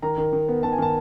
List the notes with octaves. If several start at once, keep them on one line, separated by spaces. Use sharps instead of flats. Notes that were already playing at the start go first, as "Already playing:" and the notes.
D#3 A#5
D#3
D#3
B3
D#3 A5
G#5
D#3 A5